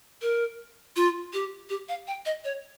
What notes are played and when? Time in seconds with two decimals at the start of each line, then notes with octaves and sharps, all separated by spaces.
0.22 A#4
0.96 F4
1.33 G4
1.69 G4
1.89 F5
2.07 G5
2.25 D#5
2.44 C#5